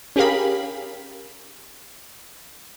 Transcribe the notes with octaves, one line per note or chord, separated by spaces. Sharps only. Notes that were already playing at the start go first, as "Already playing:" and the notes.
C#4 G4 G#4 A#4 F5 B5